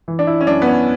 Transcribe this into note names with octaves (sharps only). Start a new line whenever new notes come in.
E3
D4
E4
C#4
F#2 D4
B3
C#4